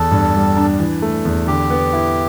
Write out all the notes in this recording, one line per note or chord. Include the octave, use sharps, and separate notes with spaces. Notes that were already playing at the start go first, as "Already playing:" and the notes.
Already playing: E2 A4
G2
G3
D4
E3
A3
E2
D3 G4
B3
E4